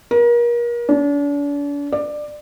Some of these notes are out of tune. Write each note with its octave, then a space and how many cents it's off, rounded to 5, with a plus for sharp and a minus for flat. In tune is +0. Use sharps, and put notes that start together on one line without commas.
A#4 +35
D4 -40
D5 +20